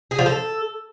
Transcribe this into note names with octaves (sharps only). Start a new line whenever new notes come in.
G#4
F3
A4